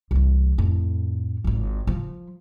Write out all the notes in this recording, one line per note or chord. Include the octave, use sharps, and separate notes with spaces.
C2 E3
F2 A2
G#1 F4
F3